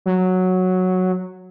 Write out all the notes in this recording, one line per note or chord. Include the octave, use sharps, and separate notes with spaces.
F#3